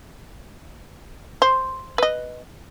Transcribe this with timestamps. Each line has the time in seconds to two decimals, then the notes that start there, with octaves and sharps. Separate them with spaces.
1.42 C5
1.98 B4 D#5